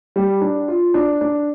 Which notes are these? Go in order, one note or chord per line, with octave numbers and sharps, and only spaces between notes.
G3
D4
F4
D4
D4